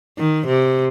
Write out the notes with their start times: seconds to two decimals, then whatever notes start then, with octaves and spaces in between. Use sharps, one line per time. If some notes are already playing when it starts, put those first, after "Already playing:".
0.18 D#3
0.47 C3